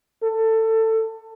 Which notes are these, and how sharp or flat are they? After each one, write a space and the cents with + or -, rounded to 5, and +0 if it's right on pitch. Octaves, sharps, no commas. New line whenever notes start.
A4 +20